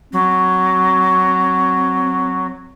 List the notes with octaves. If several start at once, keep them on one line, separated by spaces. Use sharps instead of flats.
F#3 C4